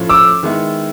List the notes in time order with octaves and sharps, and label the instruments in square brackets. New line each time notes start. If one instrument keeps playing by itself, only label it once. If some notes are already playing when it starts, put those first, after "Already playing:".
Already playing: [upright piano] A2 F3 A3 C#4 F4
[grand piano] D6 E6
[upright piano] D#3 G#3 B3 E4